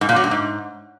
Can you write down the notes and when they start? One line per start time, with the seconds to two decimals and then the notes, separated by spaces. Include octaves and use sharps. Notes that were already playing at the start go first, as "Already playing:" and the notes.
0.01 G#2
0.09 A#2
0.16 F#3
0.24 G2
0.31 G#2